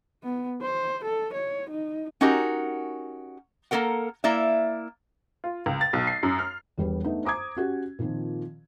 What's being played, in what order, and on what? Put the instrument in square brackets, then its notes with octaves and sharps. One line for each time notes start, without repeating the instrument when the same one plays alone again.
[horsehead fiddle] B3
C5
A4
C#5
D#4
[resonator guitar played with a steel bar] C#4 D#4 F#4 G4 A#4
A#3 F4 A4 A#4 F#5
A#3 E4 D5 E5
[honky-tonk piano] F4
C#2
A6
B1
C7
F#2
F6
[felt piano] E1 G3 G4 B4
A3 B3 D4 D#4
C5 A#5 D6 D#6 G#6
C#4 F#4 G4
A#2 D#3 F3 C4